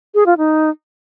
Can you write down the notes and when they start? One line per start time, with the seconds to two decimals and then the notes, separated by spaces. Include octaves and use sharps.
0.15 G#4
0.26 F4
0.38 D#4